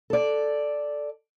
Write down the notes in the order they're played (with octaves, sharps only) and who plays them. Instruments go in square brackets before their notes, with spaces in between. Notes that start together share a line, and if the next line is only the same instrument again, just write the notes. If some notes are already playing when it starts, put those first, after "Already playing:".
[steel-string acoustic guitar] A4 D5